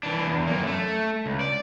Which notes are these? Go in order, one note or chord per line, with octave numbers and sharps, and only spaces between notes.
E3 D4
E2
F#2 A#3
A3
C#2
D5